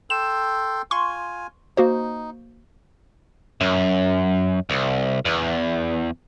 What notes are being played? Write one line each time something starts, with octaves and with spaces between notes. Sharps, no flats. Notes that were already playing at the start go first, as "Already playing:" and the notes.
A4 G5 C6 E7
F4 G#5 C6 C#6
A#3 D#4 F#4 C5
F#2
C2
E2